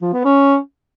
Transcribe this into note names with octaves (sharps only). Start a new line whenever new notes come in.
F3
B3
C#4